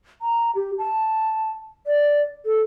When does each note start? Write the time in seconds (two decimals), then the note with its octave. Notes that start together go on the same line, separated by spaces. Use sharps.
0.21 A#5
0.55 G4
0.78 A5
1.87 D5
2.46 A4